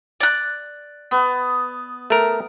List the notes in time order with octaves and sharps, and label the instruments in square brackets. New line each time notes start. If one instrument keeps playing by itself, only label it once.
[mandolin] D5 F#6
[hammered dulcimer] B3
[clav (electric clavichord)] A3 A#4